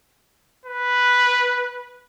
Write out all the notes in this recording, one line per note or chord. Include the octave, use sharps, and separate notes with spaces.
B4